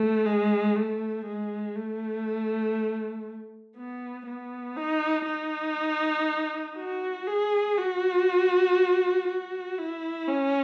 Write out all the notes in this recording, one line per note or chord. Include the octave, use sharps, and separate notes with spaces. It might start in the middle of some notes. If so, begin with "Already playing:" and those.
Already playing: A3
G#3
A3
G#3
A3
B3
B3
D#4
D#4
F#4
G#4
F#4
F#4
E4
C#4